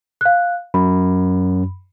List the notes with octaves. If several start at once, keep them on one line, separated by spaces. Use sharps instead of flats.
F5 F#6
F#2 B5